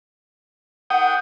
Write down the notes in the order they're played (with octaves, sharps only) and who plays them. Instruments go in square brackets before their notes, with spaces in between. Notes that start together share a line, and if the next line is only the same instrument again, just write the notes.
[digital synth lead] F#5 [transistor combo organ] G5 D#6